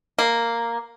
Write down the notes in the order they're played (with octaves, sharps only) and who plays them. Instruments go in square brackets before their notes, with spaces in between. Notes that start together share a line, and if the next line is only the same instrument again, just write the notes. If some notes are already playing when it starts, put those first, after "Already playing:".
[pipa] A#3